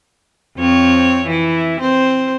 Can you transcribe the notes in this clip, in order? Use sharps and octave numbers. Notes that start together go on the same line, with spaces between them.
F2 C4 C#5
E3 E4
C4 C5